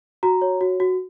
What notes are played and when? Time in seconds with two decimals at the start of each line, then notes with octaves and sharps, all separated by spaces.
0.23 F#4 A#5
0.42 C#5
0.61 F#4
0.80 F#4